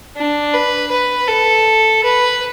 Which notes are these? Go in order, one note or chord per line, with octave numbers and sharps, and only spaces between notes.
D4
B4
B4
A4
B4